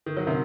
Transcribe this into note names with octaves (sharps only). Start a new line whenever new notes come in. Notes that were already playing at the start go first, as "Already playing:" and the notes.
D#3
F#3
C3 D#3